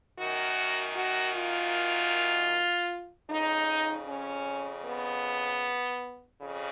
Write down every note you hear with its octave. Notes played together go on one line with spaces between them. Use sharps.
F#2 D#3 F#4
F#4
F4
F2 C#3 D#4
C#4
B3
F2 C#3